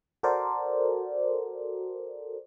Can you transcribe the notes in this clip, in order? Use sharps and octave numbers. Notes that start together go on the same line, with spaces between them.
F#4 A4 A#4 C5 D5